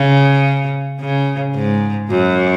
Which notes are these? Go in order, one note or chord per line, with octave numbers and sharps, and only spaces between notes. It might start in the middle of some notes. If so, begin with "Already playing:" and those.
Already playing: C#3
C#3
G#2
F#2